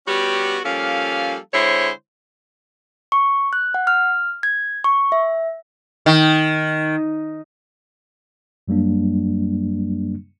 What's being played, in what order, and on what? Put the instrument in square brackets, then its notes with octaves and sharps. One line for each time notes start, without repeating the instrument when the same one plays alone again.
[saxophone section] G3 B3 C#4 F#4 G4
F3 G3 A#3 C#4 A4 F5
D3 G#3 C4 E4 C5 C#5
[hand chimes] C#6
F#6
F#5
F6
G#6
C#6
E5
[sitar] D#3
[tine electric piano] F#2 F#3 G3 A#3 D4